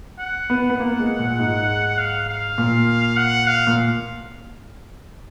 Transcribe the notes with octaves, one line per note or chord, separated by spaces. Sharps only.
F#5
B3
B3
A#3
G#3
A#2
G#2
F5
F5
A#2
F#5
F5
A#2